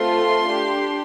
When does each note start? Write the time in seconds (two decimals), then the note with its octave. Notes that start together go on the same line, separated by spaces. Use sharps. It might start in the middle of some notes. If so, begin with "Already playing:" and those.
Already playing: A3 C4 F4 A4 C6
0.49 D4 G4